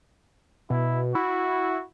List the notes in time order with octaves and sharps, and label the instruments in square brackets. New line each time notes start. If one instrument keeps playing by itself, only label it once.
[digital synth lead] B2 [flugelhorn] E4
[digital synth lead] E4 [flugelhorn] F#4